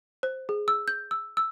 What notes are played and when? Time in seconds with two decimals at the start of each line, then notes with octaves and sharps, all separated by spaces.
0.23 C5
0.49 G#4
0.68 E6
0.88 G6
1.11 E6
1.37 E6